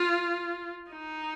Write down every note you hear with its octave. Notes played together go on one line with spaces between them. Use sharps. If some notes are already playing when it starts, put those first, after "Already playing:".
Already playing: F4
D#4